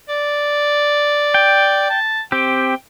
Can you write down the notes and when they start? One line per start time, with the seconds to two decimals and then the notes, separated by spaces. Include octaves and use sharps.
0.09 D5
1.34 G5
1.90 A5
2.32 C4 G4 G5